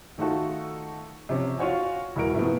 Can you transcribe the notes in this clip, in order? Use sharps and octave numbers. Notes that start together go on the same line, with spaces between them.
D#3 A3 D#4 F4 F#4 A4
C3 F3 C#4
F4 F#4 C#5 F#5 G#5
E1 E2 E4 F#4 A#4 D7
A2 C3 F3 A#3 B3